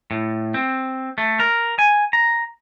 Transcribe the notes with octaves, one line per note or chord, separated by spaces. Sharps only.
A2
C4
A3
A#4
G#5
A#5